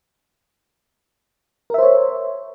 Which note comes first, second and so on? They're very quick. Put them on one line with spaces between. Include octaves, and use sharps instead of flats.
A#4 E5 C5 C#5